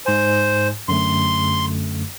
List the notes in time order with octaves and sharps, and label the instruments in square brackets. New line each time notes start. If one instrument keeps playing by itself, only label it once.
[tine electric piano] G#2 G#5 [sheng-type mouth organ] C5
[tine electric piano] F#2 D3 A3 [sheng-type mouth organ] C6